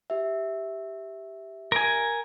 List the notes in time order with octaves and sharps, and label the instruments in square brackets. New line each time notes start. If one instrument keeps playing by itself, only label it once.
[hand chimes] G4 E5
[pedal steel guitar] A#4 G#5